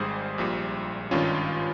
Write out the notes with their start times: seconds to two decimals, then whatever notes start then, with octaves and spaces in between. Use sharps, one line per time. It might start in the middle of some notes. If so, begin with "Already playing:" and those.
Already playing: G#1 G#2 G3 G#4 C5
0.38 A#1 A#2 G3
1.11 G#1 G2 D#3 C#4 F4